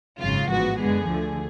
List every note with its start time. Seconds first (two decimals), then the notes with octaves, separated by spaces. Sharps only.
0.18 G#1 F#2 C#3 F4
0.49 A1 G#2 F3 B3 F#4
0.79 F#2 D3 G#3 B3 G#4
1.09 D2 D3 F3 A3